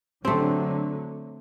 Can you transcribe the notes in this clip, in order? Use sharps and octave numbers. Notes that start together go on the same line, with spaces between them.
D3 F#3 A3 C4